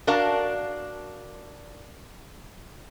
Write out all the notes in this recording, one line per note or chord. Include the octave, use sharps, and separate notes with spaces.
D4 F#4 A#4 F5 A5